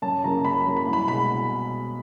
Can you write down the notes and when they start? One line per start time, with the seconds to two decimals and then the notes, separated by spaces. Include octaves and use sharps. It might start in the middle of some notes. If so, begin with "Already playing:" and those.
0.02 F#2 A5
0.24 C#3 F#3 A#3 A#5
0.44 F#2 B5
0.60 B5
0.66 C#3 F#3 A#3
0.77 B5
0.87 C2
0.93 B5
1.08 B2 G#3 B5